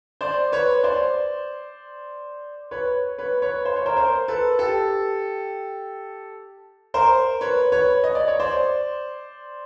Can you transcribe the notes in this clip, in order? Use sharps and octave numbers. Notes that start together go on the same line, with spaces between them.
C5 D5
B4 C#5
C5 D5
B4 C#5
B4 C#5
B4 C#5
C5
C#5
A#4 C5
A#4 C5
A4 B4
G4 A4
A#4 C5
B4 C#5
B4 C#5
D#5
D5
C#5
C5 D5